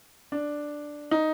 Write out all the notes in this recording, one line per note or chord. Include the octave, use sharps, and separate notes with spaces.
D4
D#4